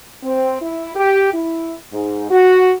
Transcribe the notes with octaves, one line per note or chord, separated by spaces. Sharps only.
C4
E4
G4
E4
G#2
F#4